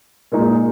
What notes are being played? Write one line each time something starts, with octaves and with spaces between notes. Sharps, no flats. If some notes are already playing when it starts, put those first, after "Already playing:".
A#2 G#3 D#4